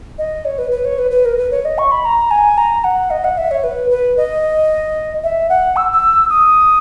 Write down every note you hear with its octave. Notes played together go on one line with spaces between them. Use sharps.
D#5
C#5
B4
B4
C#5
B4
B4
A#4
B4
C#5
D#5
C#6
B5
A#5
G#5
A#5
F#5
D#5
F#5
E5
C#5
B4
B4
D#5
E5
F#5
E6
E6
D#6